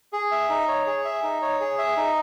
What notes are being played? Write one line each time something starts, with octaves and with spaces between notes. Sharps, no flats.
G#4
E5
D#4
C#5
G#4
E5
D#4
C#5
G#4
E5
D#4